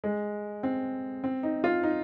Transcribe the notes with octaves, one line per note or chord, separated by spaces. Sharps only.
G#3
C4
C4
D#4
F4
D#4